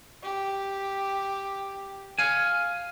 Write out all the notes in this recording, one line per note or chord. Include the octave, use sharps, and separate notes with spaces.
G4
F5 G#5